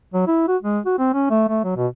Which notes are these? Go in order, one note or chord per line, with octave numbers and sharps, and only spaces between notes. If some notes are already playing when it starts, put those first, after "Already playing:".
F#3
E4
F#4
G#3
F#4
C4
C#4
A3
A3
F#3
B2